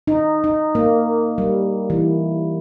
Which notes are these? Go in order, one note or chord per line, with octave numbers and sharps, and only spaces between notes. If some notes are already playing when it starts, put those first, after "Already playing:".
D#4
D#4
A#3
G3
E3